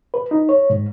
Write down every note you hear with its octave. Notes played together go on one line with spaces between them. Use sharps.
B4
D#4
C#5
G#2